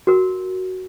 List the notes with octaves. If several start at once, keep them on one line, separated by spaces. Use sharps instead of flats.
F#4 A#4